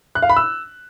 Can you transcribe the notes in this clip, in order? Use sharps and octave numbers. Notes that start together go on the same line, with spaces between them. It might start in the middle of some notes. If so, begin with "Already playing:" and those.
F#6
F5
B5
E6